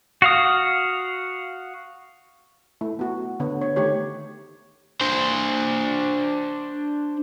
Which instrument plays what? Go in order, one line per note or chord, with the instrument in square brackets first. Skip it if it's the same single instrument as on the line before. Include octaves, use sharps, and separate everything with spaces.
[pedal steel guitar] F#4 F5 D#6
[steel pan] A3 E4
B3 F#4
D3 B3 C#5
C#5
D#3 A3 D#4 G4 C#5
[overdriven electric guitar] D4 C5